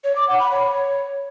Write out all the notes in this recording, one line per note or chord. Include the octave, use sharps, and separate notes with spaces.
C#5
D6
F#5
B5
C#5